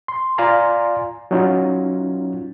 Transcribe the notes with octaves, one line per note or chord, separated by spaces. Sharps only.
C6
F4 D5 F5 G#5 A#5 C6
F#3 C#4 D#4 F4 F#4